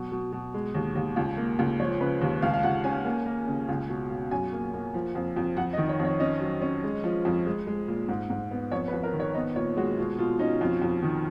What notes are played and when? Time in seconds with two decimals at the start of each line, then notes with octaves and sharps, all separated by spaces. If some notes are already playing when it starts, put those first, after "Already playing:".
Already playing: B2 F#3
0.12 B2
0.32 B2
0.54 G#3
0.75 D#2
0.95 D#2
1.16 C#2
1.37 A#3
1.59 C#2
1.80 F3 C#5
2.01 C#3 B4
2.21 D#2
2.42 C#2 F5
2.54 F5
2.63 C#2 F#5
2.84 C#4 G#5
3.05 A#3
3.26 A#3
3.47 C#3
3.69 C#2
3.89 B2
4.10 B2
4.31 F#2 G#5
4.53 A#3
4.73 A#3
4.94 F3
5.15 F2
5.36 F2
5.57 F2 F#5
5.73 D#5
5.78 D#3
5.89 C#5
5.99 F2
6.04 C#5
6.20 C#4 D#5
6.40 F#3
6.62 C#4
6.84 G#3
7.04 F3
7.25 F2
7.46 G#3
7.67 G#3
7.88 A#2
8.08 G#2
8.30 G#2
8.51 B3
8.71 F2 C#5
8.88 B4
8.93 F2
9.03 A#4
9.13 D#3
9.20 C#5
9.34 B3 D#5
9.56 A#2 C#5
9.77 G#3 F#4
9.97 B2 F4
10.18 B2 F4
10.39 C#4 D#4
10.60 F2 F4
10.82 F2
11.03 D#3